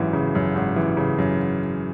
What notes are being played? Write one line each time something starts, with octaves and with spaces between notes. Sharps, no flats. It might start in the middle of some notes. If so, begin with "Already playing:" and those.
Already playing: G#1 F#2 E3
C#3
F#2
G#1
E3
C#3
F#2